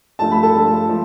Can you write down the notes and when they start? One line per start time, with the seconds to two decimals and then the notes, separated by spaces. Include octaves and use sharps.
0.19 G2 F3 A3 A5
0.31 B5
0.43 A4 A5
0.54 G2 F3 A3
0.89 F3 A3